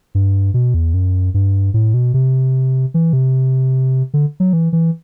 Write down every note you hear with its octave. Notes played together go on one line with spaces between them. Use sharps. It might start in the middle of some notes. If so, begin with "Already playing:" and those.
G2
B2
E2
F#2
G2
A2
B2
C3
E3
C3
D3
F#3
E3
E3